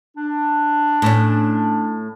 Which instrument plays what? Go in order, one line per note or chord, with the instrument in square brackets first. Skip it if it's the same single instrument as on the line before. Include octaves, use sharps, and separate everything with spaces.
[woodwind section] D4
[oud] A2 C#4